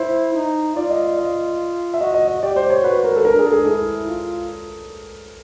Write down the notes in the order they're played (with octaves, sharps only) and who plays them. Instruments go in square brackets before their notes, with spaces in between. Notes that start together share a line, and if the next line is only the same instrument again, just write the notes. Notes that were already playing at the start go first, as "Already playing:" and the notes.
Already playing: [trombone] E4 [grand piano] C5
[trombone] D#4
[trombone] F4 [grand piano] D5
[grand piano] D#5
D5
D#5
E5
[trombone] F#4 [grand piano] D#5
[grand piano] D#5
D#5
[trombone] G4 [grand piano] D5
[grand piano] C5
C#5
[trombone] F#4 [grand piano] B4
[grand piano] A#4
A4
[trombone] D4 [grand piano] A#4
[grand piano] G#4
A4
G#4
[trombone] E4 [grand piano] G#4
[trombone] F4